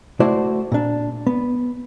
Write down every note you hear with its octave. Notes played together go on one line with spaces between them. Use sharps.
A3 E4 F#4 C5 D5
A#2 D4
B3